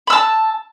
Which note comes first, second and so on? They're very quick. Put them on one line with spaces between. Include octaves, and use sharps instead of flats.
B5 E6 A5